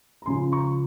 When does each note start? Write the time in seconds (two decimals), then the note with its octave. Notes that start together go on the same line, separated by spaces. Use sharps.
0.22 A#5
0.26 C#2 C#3 F3 G#5 C6
0.52 A#5 C#6